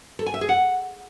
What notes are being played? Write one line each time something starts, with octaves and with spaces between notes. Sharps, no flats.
A4
G#5
E5
G#4
F#5